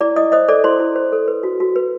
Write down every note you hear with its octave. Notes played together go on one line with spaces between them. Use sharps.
E4 D5 D6
E4 D#5 D#6
C5 D#5 D#6
A4 D5 D6
E4 C5 C6
E4
C5
A4
B4
F#4
F#4
B4